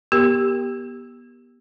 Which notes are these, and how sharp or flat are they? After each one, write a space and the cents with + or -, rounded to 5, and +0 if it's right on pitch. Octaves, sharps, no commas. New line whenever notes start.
B3 -30 G4 +0 A#4 +0